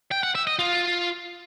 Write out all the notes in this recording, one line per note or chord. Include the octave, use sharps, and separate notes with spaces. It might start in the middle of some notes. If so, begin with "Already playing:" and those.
G5
F#5
E5
D#5
F4